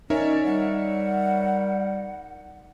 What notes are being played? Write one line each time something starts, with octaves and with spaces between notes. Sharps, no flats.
C#4 D#4 A#4 C#5 D5 E5
G3 F#5